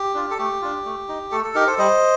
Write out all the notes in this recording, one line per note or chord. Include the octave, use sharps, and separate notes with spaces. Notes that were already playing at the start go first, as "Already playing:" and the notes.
Already playing: G4
D4 F4
A4
A3 G4
D4 F4
A3
D#4
A3 A4
A4
D#4 G4 A#4
A4 C5
G3 C5 D#5